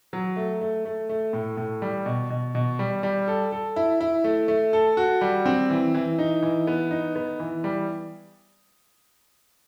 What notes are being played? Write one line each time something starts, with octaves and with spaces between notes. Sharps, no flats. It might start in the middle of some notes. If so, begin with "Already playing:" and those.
F#3
A3
A3
A3
A3
A2
A2
G3
B2
B2
B2
G3
G3
A4
A4
E4
E4
A3
A3
A4
F#4
G3
C4
E3
E3
D#4
E3
B3
D#4
B3
E3
G3